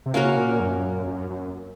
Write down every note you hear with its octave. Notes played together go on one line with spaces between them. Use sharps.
C3
C#3 A#3 C#4 F#4 A#4
A#2
F#2
F#2
F#2